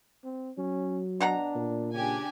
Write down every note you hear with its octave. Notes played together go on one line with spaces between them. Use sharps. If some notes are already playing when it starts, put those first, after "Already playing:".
C4
F#3 C#4
B2 D4 F#5 A#5
A#2
C#3 D4 G4 G#5